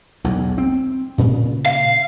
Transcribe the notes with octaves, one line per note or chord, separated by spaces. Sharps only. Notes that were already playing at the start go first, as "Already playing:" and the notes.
B1 E2
C4
A#2 C#3
F5